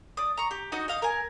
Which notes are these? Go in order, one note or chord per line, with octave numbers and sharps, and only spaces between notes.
D5 D#6
A#5 C#6
G4
D#4 F#4 D#5
D#5 F5 D#6
A#4 G#5